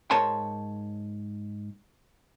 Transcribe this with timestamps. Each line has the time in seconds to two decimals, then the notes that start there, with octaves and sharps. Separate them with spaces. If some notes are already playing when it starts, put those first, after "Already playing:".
0.11 G#2 A#4 C#5 A5 C6